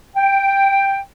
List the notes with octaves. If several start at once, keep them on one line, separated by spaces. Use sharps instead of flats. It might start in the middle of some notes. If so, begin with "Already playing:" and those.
G5